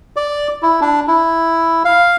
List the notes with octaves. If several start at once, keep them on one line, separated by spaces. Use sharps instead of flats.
D5
E4
D4
E4
F5